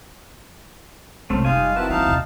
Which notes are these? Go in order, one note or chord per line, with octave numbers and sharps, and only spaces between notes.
C2 G#3 A3 C4 C#4
F#1 G3 D#4 F4 F5 G#5
D#3 C4 E4 F#4 B4 A5
E3 A#3 D#4 F5 A5
D#2 A#2